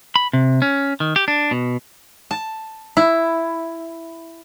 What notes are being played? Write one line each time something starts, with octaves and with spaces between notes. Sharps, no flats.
B5
C3
C#4
D#3
G4
D4
B2
A5
E4